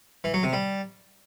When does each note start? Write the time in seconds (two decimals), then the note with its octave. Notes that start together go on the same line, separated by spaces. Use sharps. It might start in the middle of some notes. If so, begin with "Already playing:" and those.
0.24 E3
0.34 F#3
0.43 C3
0.53 G3